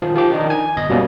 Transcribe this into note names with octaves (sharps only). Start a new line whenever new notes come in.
D#3 F3
F3 G4 D6
D#3 D4 D#4
G#5
G1 D#5
B2 G3 A#3 C#4